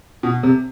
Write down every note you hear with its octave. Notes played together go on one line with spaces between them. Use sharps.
B2
C3